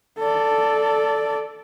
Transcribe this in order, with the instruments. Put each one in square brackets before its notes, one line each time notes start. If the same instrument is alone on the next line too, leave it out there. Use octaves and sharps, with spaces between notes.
[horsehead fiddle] A4 D5